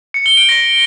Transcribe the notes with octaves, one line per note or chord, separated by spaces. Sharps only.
C#7
G7
D7
A#6